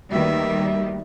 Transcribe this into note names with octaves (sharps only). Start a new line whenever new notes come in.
D2 D#3 G3 A#3 B4 E5